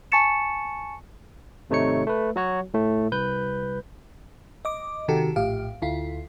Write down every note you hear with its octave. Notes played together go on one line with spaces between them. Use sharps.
G#5 A5 C#6 A6 C#7 E7
G#1 C3 A3 D#4 C#5 C#7
A3 B4
F#3 F#4 C#5
A2 A3
C2 B4 G6
D#5 D6
C3 D#3 F#4 G4 A4
A#1 A2 G4 F5
D2 E4 F4